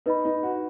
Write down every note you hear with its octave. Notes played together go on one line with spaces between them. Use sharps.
D#4 B4 D#5 B5
D#4
F#4